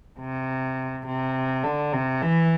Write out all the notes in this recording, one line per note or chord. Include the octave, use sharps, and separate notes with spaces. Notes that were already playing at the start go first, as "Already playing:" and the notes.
C3
C3
D3
C3
E3